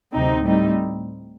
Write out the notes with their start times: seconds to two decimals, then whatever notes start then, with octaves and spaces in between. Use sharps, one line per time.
0.15 D2 C3 F#3 C4 D#4
0.43 A2 G3 C4 D#4